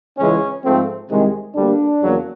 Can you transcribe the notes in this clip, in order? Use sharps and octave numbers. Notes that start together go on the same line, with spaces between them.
C#2 C#3 E3 G#3 C#4
G#2 F3 A3 C4
C2 C3 D#3 G#3
D2 D3 G3 A#3 D4
E2 C#3 F#3 A#3